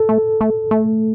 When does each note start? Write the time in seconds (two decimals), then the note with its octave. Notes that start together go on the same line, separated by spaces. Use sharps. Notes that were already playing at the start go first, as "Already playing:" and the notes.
Already playing: A4
0.09 A3
0.41 A3
0.71 A3